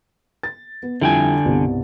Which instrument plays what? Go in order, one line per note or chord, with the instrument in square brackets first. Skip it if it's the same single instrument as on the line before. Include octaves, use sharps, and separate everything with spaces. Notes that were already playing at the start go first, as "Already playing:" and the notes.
[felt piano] A6
B3
[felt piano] F2 G3 E4 [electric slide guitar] D3 G5 G#5
[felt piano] C2 G2 B2